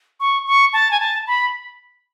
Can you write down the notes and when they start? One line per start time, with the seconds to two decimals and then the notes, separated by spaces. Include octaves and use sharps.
0.20 C#6
0.47 C#6
0.73 A5
0.91 G#5
1.00 A5
1.27 B5